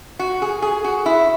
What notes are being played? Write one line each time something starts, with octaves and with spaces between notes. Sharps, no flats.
F#4
G#4
G#4
F#4
E4